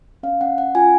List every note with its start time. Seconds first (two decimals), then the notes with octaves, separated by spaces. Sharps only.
0.23 C#4 F5
0.41 C#4 F#5
0.58 C#4 F#5
0.75 F4 G#5